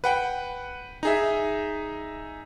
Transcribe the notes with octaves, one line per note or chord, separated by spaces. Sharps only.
B4 F#5 G5
D#4 G#4 E5